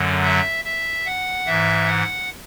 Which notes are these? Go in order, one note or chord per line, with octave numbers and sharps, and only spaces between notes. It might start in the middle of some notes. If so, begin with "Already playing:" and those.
Already playing: F#2 D3 F#3
E5
E5
F#5
G#2 E3 E5
F#5